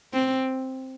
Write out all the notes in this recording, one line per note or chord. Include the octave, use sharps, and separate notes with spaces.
C4